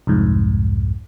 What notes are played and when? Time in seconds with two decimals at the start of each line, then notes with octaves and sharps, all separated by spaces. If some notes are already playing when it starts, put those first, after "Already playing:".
0.07 C2 F2 G#2